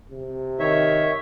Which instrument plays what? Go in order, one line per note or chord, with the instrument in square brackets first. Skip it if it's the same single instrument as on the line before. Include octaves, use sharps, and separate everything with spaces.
[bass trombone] C3
[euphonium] D#3 [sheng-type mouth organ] C#5 E5